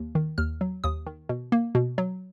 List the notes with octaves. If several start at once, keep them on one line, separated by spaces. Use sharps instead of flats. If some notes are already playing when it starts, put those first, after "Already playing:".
Already playing: D#2
D#3
D#2 F6
F#3
D#2 D#6
D#3
B2
A#3
B2
F#3